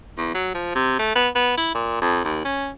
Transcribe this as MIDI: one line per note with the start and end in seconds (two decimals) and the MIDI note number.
0.18 0.33 40
0.34 0.54 54
0.54 0.72 53
0.75 0.97 48
0.99 1.15 57
1.15 1.28 59
1.35 1.54 59
1.57 1.73 64
1.75 1.97 46
2.01 2.23 41
2.25 2.40 39
2.45 2.69 61